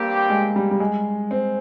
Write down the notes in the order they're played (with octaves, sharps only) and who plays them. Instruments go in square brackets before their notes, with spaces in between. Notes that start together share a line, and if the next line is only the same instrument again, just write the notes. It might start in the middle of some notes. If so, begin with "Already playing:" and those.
Already playing: [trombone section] G2 G3 C4 G4 [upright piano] A#3
[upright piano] G#3
G3
G3
G#3
C4